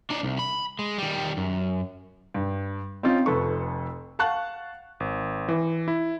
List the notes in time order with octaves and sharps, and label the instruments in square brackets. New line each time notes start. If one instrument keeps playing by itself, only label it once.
[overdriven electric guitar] D4 D#4
C2
B5
G#3
D#3 G3
F#2
[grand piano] G2
C4 C#4 D#4 F4
F1 F2 A4 B4 C#6
F5 F#5 A5 C#6 F#6
[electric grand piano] G#1
E3
E4